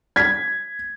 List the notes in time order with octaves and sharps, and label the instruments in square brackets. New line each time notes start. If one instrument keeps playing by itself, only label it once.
[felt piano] G#6 B6